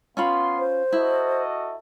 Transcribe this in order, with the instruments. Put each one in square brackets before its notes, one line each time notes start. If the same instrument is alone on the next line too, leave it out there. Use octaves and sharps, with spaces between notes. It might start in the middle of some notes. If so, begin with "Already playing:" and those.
[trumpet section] B3 F5 C6 [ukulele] C#4 F4 B5
[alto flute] C5
[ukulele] E4 [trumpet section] F#4 A4 D#5